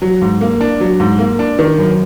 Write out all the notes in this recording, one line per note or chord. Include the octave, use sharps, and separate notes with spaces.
F#3
G#2
A#3
D4
F#3
G#2
A#3
D4
D#3
F#2